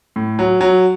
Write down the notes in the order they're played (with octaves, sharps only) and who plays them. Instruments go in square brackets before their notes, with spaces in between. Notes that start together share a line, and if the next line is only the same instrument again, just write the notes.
[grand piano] A2
F#3
F#3